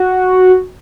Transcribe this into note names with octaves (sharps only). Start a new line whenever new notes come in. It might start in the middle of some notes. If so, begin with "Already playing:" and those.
Already playing: F#4